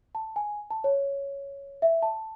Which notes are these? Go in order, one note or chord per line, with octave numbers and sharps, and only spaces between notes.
A5
G#5
A5
C#5
E5
A5